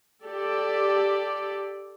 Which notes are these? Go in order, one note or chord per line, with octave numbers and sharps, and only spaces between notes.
G4 A4 D5